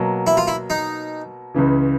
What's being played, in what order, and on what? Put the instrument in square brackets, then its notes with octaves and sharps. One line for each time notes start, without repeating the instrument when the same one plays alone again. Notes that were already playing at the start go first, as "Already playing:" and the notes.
Already playing: [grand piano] B2 F#3 A#3
[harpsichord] E4
F4
E4
D#4
[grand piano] C#2 C#3 E3